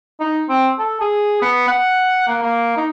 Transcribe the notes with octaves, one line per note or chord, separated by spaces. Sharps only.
D#4
C4
A4
G#4
B3
F#5
A#3
A#3
D#4